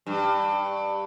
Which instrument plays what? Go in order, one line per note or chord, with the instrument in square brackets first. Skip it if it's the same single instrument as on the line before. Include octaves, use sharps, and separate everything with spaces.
[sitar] G2